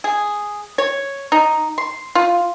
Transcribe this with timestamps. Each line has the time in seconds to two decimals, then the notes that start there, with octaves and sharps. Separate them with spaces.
0.04 G#4
0.78 C#5
1.32 D#4
1.78 C6
2.15 F4